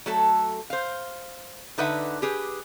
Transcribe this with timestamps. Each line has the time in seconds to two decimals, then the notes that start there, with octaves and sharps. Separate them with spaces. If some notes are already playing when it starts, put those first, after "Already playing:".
0.06 F#3 A3 A4
0.70 C5 F5
1.78 D3 D#4 B4 E5 F#5
2.22 G4 G#4 B4